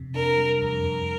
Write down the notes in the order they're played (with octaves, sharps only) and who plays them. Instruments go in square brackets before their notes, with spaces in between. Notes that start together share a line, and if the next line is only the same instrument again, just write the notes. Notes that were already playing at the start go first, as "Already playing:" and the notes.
Already playing: [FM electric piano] F2 C3
[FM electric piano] D4 [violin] A#4
[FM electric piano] G3
[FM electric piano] F2 [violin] A#4
[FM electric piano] F2